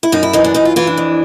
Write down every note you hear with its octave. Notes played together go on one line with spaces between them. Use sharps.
E4
F#2 D#4
E4
E3 D#4
D4
F#2 D#4
F4
E3 F4
D4
F2